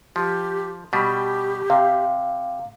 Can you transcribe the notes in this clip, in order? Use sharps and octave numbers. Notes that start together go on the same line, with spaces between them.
F3 G4
B2 G3 G4
C3 F5